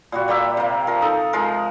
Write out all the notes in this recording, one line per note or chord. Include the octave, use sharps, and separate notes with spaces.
A#2 G3 F#4
G3 A#3 G4 E5
C3 A#3
F3 A#4
D#4 A4
F3 G#3 A#4